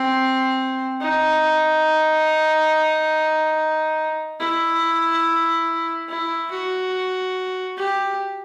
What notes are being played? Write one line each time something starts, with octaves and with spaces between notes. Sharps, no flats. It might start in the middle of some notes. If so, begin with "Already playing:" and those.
Already playing: C4
D#4
E4
E4
F#4
G4